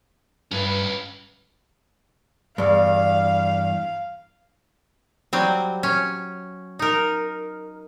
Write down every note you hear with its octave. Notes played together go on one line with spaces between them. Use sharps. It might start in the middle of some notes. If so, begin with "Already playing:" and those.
G2 C#4 B4
E2 G2 F5
F#3 G3 C4
C#4
D#4 A#4